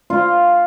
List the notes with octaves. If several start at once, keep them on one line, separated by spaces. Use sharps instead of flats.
F4